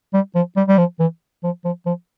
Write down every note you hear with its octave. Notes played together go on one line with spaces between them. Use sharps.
G3
F3
G3
G3
F3
E3
F3
F3
F3